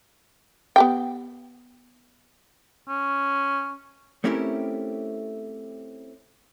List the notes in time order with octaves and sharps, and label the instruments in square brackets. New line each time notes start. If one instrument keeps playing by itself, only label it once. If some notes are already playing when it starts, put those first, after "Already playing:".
[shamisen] B3 G4 G5
[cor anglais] C#4
[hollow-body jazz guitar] A3 C4 C#4 E4 G4 A#4